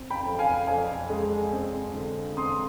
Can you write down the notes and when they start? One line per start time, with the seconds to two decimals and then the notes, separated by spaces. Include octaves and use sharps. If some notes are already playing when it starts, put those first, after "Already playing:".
Already playing: C4
0.10 G5 B5
0.25 F2
0.39 F5 G#5
0.67 F2 F5 G#5
1.10 G#3
1.52 C4
1.94 D3
2.37 C4 C6 D#6